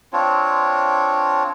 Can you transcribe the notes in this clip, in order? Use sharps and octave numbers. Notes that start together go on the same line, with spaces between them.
C4 D4 F4 C#5